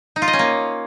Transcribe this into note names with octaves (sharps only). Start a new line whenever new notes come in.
D#4
F4
D#5
C#4
A#3